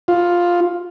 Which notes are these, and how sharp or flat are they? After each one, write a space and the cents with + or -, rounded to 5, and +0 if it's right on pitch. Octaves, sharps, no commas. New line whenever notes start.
F4 +5